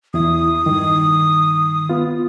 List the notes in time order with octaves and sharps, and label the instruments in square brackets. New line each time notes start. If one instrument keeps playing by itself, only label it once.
[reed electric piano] E2 E4 [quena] D#6
[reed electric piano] G2 D#3
B3 F4